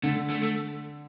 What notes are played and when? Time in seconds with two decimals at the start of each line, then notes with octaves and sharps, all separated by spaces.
0.03 D3 A3
0.30 A3
0.43 A3